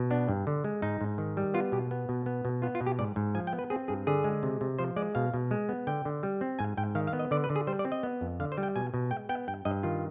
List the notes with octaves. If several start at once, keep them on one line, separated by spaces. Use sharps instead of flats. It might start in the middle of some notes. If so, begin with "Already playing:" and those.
Already playing: B2
B3 D4
G2
D3
G#3
G#2 D#4
G#2
D#3
G3
B3 F4
B2 G4
B3
B2
B3
B2
B3 F4
F4
B2
G4
G#2 D5
G#2
F3 G#5
G5
B3
B4
C4 G#4
G2 G#4
D3 G#4
G#3
C3
C3
F3 C5
G#3 D5
B2 F5
B2
G#3
B3
D3 G5
D3
G3
C4
G#2 G#5
G#2 G5
D#3 F5
F5
B3
D#5
D3 D5
B4
D3
G#4
G3 C5
D5
C4
D#5
B3
F2
D3 F5
C5
G3
G5
B2 G#5
B2
G#3 G5
B3 G5
G2 G5
G2 D#5
D#3 F4